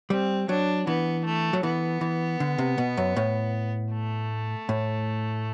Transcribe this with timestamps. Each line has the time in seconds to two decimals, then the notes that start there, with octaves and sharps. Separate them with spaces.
0.10 G3 C4
0.49 F#3 D4
0.87 E3 B3
1.25 A3
1.53 F#3
1.63 E3 B3
2.01 E3
2.40 D3
2.58 C3
2.78 B2
2.97 F#2
3.16 A2
3.93 A3
4.69 A2